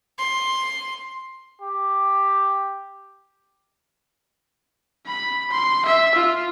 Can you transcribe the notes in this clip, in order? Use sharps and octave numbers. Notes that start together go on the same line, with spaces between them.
C6
G4
B5
C6
E5
F4